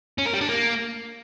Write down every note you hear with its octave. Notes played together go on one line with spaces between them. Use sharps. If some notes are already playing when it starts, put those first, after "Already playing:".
C#4
A#4
G3
D4
A#3